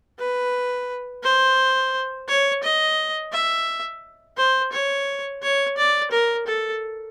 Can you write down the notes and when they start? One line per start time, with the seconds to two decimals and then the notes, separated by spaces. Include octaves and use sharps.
0.18 B4
1.23 C5
2.28 C#5
2.63 D#5
3.33 E5
4.37 C5
4.72 C#5
5.42 C#5
5.77 D5
6.11 A#4
6.47 A4